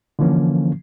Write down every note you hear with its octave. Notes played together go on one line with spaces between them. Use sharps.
D3 E3 F3 A#3 C#4